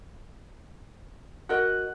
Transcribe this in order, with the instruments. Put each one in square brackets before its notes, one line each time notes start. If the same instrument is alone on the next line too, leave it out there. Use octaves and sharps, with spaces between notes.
[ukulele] F#4 A#4 D#5 [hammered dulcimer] F#5